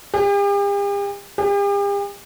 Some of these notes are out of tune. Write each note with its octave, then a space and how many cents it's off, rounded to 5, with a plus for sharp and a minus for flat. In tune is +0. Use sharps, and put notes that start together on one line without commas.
G4 +45
G4 +45